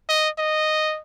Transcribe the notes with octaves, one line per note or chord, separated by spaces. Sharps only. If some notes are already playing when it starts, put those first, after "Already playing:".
D#5
D#5